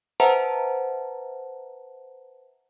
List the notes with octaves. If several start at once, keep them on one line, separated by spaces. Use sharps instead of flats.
B4 C5 E5 F#5 A5 A#5